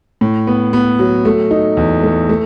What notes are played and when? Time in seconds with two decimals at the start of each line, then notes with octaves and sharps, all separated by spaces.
0.21 A2
0.47 B3
0.73 B3
0.99 F#3
1.25 A3
1.51 D#4
1.77 E2
2.03 A3
2.29 A3